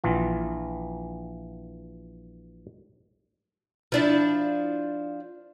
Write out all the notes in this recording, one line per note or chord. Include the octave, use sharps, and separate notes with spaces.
A#1 E3 F4
F3 D4 E4